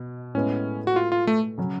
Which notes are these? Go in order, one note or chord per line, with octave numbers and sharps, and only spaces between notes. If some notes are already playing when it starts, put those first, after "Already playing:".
Already playing: B2
A2 G#3 B3 C#4
F#4
F4
F4
A3
C#3 F#3 C#4